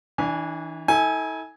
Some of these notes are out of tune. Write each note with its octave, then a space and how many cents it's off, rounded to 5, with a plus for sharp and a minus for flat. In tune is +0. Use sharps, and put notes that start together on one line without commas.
E3 -30 D4 +0 G#5 +0
E4 -45 A4 +0 G#5 +0